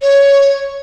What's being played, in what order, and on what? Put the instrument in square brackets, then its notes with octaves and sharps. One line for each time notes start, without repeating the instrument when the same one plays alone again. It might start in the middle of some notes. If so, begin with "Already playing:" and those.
[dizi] C#5